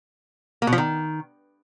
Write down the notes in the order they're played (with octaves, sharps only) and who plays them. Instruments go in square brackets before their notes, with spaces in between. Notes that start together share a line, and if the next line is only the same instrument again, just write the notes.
[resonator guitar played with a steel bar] A#3
B2
F3
D#3